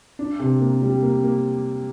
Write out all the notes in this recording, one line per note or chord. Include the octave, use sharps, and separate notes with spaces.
D4
C3
A#3
G3
A#3
A#3